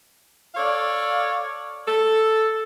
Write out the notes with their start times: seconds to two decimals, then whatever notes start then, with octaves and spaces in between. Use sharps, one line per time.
0.55 A4 C#5 D5 F5
1.88 A4